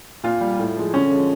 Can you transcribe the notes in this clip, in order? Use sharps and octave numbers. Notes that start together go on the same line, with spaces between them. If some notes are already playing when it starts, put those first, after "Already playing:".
A#2 F4
G3
A2
F3 G#3
D3 C#4
F3 G#3